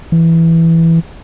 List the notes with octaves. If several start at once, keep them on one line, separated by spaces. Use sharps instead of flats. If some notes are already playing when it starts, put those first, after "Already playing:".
E3